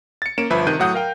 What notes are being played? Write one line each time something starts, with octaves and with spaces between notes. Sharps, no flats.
A6 C#7
A#3 C#4 D7 E7
G1 F3 B4 E5
C3 D#3 F#6 G6 D#7
A2 F#3 F#5 D#6 G6
A#4 F5 G5